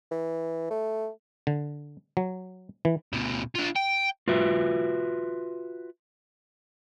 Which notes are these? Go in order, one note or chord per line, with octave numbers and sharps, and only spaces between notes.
E3
A3
D3
F#3
E3
D2 B2
D4 F4
G5
F4 F#4 B4 E5